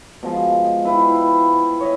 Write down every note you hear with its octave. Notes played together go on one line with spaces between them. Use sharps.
B2 F3 G#3
E4 B4 F5 G5
C#5 D#5 E5